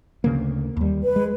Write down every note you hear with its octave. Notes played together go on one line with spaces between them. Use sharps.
D2 C#3 A#3
D#2 G3
B4
G#3